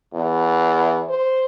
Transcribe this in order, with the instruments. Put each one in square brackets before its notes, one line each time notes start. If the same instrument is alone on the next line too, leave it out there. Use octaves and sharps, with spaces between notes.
[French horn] E2
C5